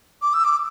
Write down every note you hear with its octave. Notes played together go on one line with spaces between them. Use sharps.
D6
E6
D6